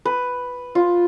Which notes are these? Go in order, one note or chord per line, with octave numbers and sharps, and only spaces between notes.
B4
F4